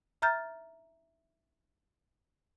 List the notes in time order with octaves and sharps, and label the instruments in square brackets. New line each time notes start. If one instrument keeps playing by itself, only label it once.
[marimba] E5 A#5 F6 G6 A6